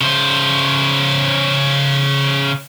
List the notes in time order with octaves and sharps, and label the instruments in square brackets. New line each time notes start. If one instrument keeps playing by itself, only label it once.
[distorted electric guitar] C#3 C5